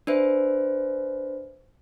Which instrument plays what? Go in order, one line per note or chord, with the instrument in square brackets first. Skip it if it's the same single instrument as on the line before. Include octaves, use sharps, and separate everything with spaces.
[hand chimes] D4 B4 C5 E5